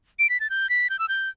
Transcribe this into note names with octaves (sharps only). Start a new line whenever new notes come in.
D7
B6
A6
G6
B6
G6
E6
G6